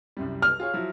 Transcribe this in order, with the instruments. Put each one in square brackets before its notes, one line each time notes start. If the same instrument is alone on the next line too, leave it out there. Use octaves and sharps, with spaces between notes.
[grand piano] C2 F#2 G3
[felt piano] F6
[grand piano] F4 G#4 C#5
F3 F#3 E4